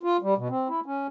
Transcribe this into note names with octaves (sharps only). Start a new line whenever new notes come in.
F4
G3
B2
C4
E4
C#4